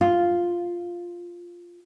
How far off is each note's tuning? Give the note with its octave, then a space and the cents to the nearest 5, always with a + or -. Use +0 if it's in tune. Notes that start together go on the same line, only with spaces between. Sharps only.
F4 +0